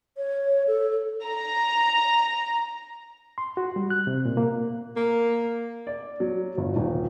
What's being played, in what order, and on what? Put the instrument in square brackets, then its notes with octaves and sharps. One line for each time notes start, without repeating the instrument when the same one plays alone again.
[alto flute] C#5
A4
[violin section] A#5
[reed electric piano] C6
F#4
G3
F#6
C3
A#2
A#3
[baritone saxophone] A#3
[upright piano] D5
F#3
G1
D#1